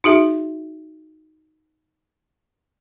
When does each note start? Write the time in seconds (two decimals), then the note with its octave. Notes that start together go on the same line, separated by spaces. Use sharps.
0.04 D#4 F#4 G#4 E5